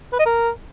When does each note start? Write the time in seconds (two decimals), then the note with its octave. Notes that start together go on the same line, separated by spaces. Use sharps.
0.13 B4
0.19 D#5
0.26 A#4